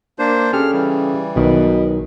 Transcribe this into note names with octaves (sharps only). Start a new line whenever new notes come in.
A#3 D4 C5
C#3 G4 A4 G#5 F6
E3 G3
B1 B2 D#3